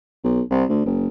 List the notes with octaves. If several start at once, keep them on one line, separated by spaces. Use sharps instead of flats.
B1
C2
D2
F#1